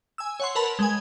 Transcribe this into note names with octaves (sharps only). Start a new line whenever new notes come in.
G#5 E6
C#5 F#5 C6
A#4 B4 A5 B5
G#3 G#5